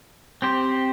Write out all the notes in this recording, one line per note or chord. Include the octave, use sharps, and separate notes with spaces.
C4 G4 C5